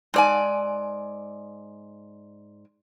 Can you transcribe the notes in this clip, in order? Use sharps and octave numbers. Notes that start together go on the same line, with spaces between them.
G#2 D5 G#5